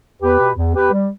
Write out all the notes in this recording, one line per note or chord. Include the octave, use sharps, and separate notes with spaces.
E2 G4 B4
B2
E2
E2 G4 B4
G3